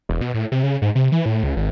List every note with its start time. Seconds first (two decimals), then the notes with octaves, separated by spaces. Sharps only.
0.09 E1
0.21 B2
0.34 A2
0.52 C3
0.63 C#3
0.82 G#2
0.95 C3
1.12 E3
1.26 A2
1.43 C#2
1.56 G#1